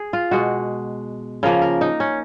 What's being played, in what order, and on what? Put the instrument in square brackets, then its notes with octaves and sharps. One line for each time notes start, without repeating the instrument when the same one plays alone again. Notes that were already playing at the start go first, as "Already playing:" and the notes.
Already playing: [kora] G#4
F4
B2 G#3 F#4
C#3 F3 A#3 A#4
A#4
D#4
C#4